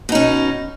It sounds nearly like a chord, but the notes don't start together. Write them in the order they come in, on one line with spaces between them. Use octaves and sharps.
B2 D#4 C#4